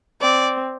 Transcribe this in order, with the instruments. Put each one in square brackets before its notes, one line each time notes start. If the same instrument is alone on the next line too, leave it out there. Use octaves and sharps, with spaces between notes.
[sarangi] C4 [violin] D5